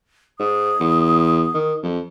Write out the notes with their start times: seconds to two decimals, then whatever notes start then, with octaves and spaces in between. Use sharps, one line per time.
0.39 G#2 D#6
0.80 E2
1.54 D#3
1.83 F2